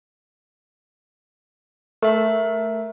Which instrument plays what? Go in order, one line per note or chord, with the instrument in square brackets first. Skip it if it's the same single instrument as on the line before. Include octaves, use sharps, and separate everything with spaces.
[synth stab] A3 [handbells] A#4 E5